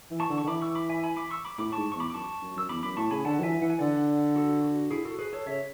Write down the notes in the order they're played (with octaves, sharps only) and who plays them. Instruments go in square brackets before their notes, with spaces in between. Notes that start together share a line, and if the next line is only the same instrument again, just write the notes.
[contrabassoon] E3
[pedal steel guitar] A5 C#6
[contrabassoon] D3
[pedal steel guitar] C#6
[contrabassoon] D3
[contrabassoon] E3 [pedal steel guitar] B5 D6
[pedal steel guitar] C#6 E6
B5 D6
E5 G#5
G#5 B5
B5 D6
C#6 E6
B5 D6
[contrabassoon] A2 [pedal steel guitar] B5 D6
[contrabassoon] G#2 [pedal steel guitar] A5 C#6
[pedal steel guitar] C#6
[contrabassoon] E2 [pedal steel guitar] B5 D6
[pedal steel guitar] D6
[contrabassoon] F#2 [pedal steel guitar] A5 C#6
[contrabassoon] F#2
[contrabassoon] F#2 [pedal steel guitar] E6
[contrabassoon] E2 [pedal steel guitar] B5 D6
[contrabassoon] F#2 [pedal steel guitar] B5 D6
[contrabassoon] A2 [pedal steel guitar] A5 C#6
[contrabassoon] C#3 [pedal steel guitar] G#5 B5
[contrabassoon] D3 [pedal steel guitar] F#5 A5
[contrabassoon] F#3
[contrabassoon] E3 [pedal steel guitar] E5 G#5
[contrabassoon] E3 [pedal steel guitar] F#5
[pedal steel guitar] G#5
[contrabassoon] D3 [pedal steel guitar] D5 F#5
[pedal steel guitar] F#4 A4
F#4
E4 G#4
F#4 A4
G#4 B4
A4 C#5
[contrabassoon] C#3 [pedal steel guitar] C#5 E5